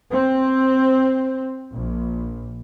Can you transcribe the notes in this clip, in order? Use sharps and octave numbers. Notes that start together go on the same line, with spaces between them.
C4
A#1